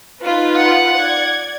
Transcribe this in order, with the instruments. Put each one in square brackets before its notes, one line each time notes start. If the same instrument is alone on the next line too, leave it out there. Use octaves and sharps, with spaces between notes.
[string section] D#4 F4 B4
[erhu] F#5
[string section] D5 G#6